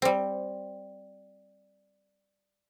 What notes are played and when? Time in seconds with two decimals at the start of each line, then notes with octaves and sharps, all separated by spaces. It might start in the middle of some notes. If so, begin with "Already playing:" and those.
0.02 G3 C4